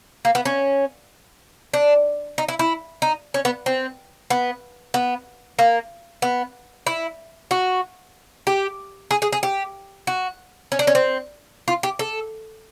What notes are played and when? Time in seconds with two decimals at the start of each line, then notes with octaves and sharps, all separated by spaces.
0.25 A#3
0.35 B3
0.45 C#4
1.74 D4
2.38 D#4
2.48 E4
2.59 E4
3.02 D#4
3.34 C#4
3.45 B3
3.66 C4
4.30 B3
4.94 B3
5.59 A#3
6.22 B3
6.87 E4
7.51 F#4
8.47 G4
9.11 G#4
9.22 G#4
9.32 G#4
9.43 G4
10.07 F#4
10.72 C#4
10.79 D4
10.87 C#4
10.95 C4
11.68 F4
11.83 G4
11.99 A4